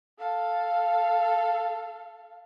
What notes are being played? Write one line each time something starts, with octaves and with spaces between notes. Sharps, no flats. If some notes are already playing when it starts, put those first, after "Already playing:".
A4 F5